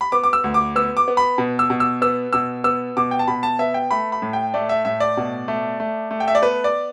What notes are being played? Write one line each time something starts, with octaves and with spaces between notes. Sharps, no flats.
B5
B3 D6
D6
E6
D2
D6
B3 E6
D6
B3
B5
B2
E6
B2
E6
B3 E6
B2 E6
B3 E6
B2 D6
G5
A5
B2 B5
A5
B3 E5
G5
A3 B5
B5
A2
G5
A3 D5
E5
A2 E5
D5
B2
A3
A3
A3
G5
E5
D5
B3 B4
D5